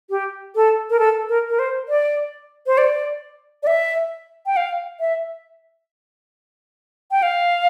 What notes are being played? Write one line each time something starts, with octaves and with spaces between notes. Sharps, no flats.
G4
A4
A#4
A4
A#4
A#4
C5
D5
C5
D5
D5
E5
G5
F5
E5
G5
F5